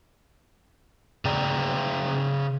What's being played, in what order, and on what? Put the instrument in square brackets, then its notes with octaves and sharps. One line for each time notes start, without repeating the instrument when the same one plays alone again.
[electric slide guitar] C#3 G#4 D5 G5 A#5